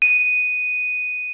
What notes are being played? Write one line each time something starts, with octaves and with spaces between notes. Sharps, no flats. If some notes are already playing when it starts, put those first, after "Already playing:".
D#7